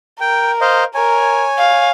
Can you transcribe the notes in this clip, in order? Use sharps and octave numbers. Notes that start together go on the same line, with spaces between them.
A#4 G5
C5 D#5 F5
A#4 C#5 G#5
F5